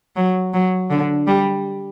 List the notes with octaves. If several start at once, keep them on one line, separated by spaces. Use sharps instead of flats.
F#3
F#3
D3
G3